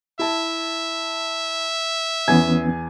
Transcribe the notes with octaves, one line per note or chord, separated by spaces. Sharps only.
E4 E5 A5
E2 E3 B3 C#4 G#5 G#6